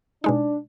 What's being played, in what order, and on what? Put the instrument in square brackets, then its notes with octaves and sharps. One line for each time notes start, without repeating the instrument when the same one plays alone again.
[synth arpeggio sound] B2 G#3 D#4 [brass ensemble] D4